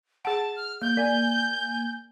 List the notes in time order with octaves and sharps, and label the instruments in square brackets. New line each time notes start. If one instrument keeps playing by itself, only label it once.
[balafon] G#4 F#5 [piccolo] A5
[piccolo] F6
[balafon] A#3 [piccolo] G6
[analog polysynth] A#3 G#5 [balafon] D5